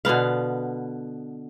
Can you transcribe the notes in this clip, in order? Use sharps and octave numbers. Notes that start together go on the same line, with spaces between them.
B2 D3 B3 F5